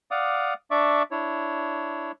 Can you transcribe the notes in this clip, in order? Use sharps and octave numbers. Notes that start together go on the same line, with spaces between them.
D5 F5 F#5 D6 D#6
D4 D5 E5 C#6 D6
D4 E4 C#5